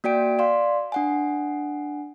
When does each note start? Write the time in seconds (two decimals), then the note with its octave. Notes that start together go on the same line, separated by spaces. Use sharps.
0.04 A#3 F#4 D5 G5 D7
0.39 D5 F5 C6
0.92 D4 F#5 G#5